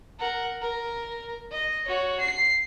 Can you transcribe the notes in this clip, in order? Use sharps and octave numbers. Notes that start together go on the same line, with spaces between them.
A#4 F#5
A#4
D#5
F#4 C#5
C7